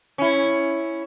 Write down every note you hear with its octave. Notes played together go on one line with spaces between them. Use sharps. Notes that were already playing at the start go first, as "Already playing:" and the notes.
C#4 E4